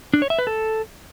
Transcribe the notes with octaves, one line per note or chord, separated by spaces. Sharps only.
D4
C#5
E5
B4
A4